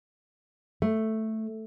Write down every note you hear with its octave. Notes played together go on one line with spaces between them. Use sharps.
A3